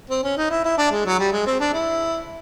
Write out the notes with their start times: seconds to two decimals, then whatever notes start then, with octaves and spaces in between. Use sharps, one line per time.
0.10 C4
0.23 C#4
0.37 D#4
0.50 E4
0.64 E4
0.78 D4
0.91 G#3
1.06 F#3
1.19 G3
1.32 G#3
1.46 C4
1.60 D4
1.73 E4